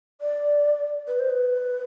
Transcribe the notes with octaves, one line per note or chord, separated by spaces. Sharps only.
D5
B4
C5
B4